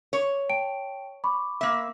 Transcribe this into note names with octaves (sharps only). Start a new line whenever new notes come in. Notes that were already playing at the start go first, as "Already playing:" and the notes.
C#5
G5 A5 D7
B5 C#6 D6
A#3 E5